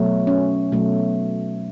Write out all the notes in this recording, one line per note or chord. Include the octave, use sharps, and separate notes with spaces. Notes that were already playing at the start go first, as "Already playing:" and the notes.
Already playing: B2 F#3 A3
C#4
B2 F#3 A3